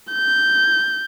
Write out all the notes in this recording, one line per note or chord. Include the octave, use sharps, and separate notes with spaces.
G6